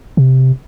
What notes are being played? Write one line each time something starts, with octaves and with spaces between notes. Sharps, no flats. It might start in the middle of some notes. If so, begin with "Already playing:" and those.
C3